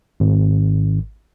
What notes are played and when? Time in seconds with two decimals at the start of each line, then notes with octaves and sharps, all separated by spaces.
0.20 G#1